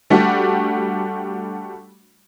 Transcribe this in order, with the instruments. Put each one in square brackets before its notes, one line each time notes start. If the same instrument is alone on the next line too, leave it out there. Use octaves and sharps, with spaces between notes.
[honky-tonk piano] G3 A3 D4 F#4 G4